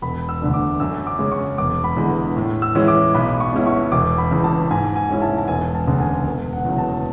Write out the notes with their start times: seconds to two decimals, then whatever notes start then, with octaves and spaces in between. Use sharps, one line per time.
0.02 E1 B5
0.29 E6
0.41 D2 D3 A3 D4
0.54 D6
0.80 F#2 E6
1.07 D6
1.19 C#3 G#3 C#4
1.32 C#6
1.58 E1 D6
1.84 B5
1.97 E2 D3 G#3
2.36 A2
2.62 E6
2.75 E3 G#3 C#4 E4
2.88 D6
3.15 B1 B5
3.40 C#6
3.53 B2 G#3 C#4 E4
3.67 C#6
3.92 E1 D6
4.18 B5
4.31 E2 C#3
4.44 A5
4.71 G#2 G#5
4.96 G#5
5.09 G#3 C#4 E4
5.22 A5
5.38 A5
5.48 E1 G#5
5.74 A5
5.87 D2 C#3
6.00 G#5
6.27 E1
6.53 F#5
6.65 E2 C#3 F#3
6.78 A5